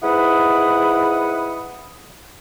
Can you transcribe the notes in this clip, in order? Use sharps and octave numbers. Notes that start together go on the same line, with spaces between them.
G#2 E4 B4 F#5 B5 D#6